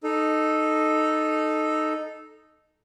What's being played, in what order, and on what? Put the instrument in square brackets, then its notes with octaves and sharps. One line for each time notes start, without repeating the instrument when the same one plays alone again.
[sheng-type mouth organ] D#4 A4